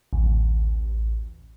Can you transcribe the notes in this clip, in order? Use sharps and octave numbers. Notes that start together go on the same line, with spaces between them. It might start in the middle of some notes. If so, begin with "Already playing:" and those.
A1 D2